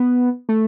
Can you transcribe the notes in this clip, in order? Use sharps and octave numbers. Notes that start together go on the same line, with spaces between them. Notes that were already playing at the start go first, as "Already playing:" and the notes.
Already playing: B3
A3